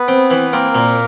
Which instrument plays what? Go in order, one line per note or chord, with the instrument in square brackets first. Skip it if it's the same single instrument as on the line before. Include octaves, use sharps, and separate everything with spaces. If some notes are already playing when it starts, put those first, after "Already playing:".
Already playing: [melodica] B3 B4
[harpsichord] C4
E3
[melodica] A#3 A#4 [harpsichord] C4
[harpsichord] A#2